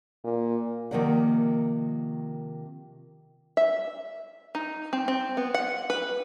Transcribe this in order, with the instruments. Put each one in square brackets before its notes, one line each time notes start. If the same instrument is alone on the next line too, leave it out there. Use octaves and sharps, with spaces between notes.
[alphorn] A#2
[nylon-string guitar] C3 D#3 F3 A#3 D5 F#5
[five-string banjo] E5
D#4
C4
C4
B3
F#5
B4